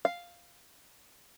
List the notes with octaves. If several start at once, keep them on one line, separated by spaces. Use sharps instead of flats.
F5